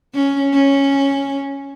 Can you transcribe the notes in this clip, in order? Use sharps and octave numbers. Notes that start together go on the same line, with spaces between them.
C#4
C#4